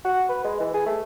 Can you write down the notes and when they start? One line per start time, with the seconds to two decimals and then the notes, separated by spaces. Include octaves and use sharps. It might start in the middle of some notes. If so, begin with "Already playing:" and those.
0.05 F#4
0.29 B4
0.44 G#3
0.60 E3
0.74 G#4
0.86 A3